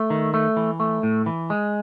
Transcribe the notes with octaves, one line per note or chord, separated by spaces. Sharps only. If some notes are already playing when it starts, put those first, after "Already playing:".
Already playing: A3
D#3
A3
E3
A3
A2
E3
G#3